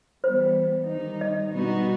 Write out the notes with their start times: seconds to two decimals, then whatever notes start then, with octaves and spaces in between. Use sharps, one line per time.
0.24 E3 G3 B3 C5
0.88 D#3 G3 D#4
1.21 D#5
1.53 B2 G3 B3 D#4 F#4